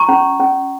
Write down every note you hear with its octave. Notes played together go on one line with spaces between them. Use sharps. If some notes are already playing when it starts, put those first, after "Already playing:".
Already playing: F4 A#5 C#6
C#4
C#4